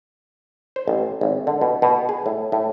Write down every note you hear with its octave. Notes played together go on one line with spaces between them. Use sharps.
C5
A1
G#1
D3
B2
B2
G#4
A2
A2